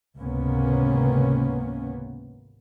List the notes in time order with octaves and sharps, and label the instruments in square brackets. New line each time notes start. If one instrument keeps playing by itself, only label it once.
[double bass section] G#1 C#2 C3 A#3 B3 C#4